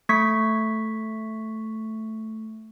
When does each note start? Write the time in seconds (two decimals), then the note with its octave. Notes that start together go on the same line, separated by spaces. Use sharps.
0.09 A3 C#6 G#6 B6